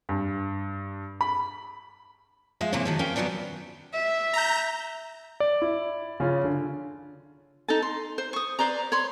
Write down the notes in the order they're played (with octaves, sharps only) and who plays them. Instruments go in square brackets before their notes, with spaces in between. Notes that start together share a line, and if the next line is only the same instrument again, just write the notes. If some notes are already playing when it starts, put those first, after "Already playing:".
[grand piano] G2
B5
[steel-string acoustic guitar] F3 G#3 G#4 E5 F5
G#2 C3 E3 A#3 E4 C#5
D#3 F3 F#3
F2 C#4 A#4 F5 G5
D#3 E3 F#3 B3 D4
[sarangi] E5
[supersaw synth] A#5 G6
[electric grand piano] D5
[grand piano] E4
C#3 C#4 F4
D3
[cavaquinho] D#4 A4 A5
C6
C5
C#6 D#6
B4 C5 D5 A#5
C#5 B5 C6